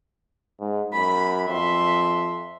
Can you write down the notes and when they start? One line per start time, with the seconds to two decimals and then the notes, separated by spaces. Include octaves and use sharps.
0.60 G#2
0.93 F#2 B5
1.48 F2 E5 C6